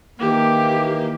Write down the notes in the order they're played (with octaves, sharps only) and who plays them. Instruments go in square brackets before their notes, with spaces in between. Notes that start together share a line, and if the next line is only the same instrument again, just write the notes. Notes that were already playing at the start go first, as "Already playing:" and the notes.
[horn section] D#3 E3 A#3 [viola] G4